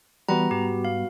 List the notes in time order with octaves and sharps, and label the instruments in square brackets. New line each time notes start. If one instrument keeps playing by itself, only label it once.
[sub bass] E3 [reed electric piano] G3 B3 [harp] F#4 B4 [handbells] A#5
[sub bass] G#2 [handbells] G4
[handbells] F5